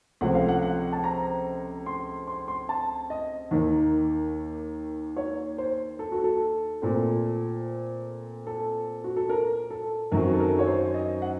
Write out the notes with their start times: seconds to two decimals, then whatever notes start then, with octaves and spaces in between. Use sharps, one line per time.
0.21 C#2 C3 F3 A3 C4 F#5
0.35 F5
0.49 F#5
0.63 F#5
0.92 A5
1.04 A#5
1.86 C6
2.28 C6
2.48 C6
2.69 A5
3.10 D#5
3.51 D#2 D#3 A#3
5.17 C#5
5.58 C5
5.99 A4
6.12 F#4
6.24 A4
6.82 A#2 A3 C4
8.47 A4
9.04 F#4
9.16 A4
9.29 A#4
9.70 A4
10.12 F#2 D#3 F#3 C4 A#4
10.33 A4
10.40 A#4
10.59 C#5
10.67 C5
10.94 D#5
11.22 F#5